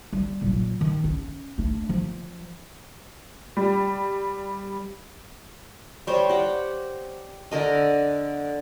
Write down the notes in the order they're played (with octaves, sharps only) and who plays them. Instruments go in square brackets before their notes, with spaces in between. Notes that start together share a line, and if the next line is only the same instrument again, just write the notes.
[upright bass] G3
A#2 F#3
D#3
C#4
A3 D4
F3
[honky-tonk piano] G3
[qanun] G3 C5 C#5
G4 F#5
D3 A#4 D#5